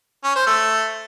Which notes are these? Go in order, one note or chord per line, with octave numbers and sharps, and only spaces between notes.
C#4
C5
A3